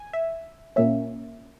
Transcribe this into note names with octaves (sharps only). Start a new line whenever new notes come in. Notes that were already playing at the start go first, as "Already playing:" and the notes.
Already playing: G#5
E5
A#2 A#3 C#4 E5